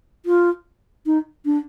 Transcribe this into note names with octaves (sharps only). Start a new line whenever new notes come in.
F4
D#4
D4